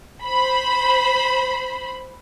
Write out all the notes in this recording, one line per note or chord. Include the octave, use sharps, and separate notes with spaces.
C5 B5